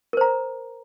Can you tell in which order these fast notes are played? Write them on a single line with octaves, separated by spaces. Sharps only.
A#4 C5 A#5